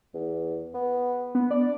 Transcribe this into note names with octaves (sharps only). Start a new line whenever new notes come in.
E2
B3
B3
D4 D5